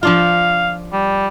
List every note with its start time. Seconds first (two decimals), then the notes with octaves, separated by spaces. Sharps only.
0.03 F3 D4 F4 F5
0.93 G3